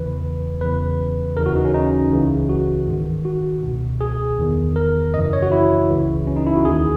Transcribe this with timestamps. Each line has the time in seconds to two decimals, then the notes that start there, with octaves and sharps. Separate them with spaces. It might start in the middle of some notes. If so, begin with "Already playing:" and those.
Already playing: E2 C#3 E3 B4
0.61 E2 C#3 E3 B4
1.37 D#2 C#3 E3 A#4
1.46 F#4
1.55 D#4
1.65 C#4
1.74 D#4
2.12 C#2 C#3 E3
2.49 F#4
2.87 G#2 D#3
3.25 F#4
3.63 C#2 B2
4.01 G#4
4.39 E2 D#3
4.76 A#4
5.14 F#2 C#3 E3 D#5
5.33 C#5
5.42 F#4
5.52 E4
5.90 C#2 C#3 E3
6.27 C#4
6.36 D#4
6.46 E4
6.56 F#4
6.65 D#2 D#3 G#4